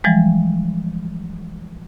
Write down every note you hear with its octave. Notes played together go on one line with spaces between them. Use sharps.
E3 F3 G3 G#3